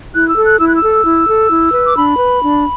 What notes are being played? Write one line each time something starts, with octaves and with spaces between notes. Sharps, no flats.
E4 F#6
E6
A4
F#6
E4 E6
F#6
E6
A4
E4
A4
E4
B4
D6
D4 B5
B4
D4